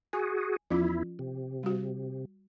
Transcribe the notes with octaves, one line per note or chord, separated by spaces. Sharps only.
F#4 G#4 G#5
E2 F3 C#4 E4 F4
C3
G3 F#4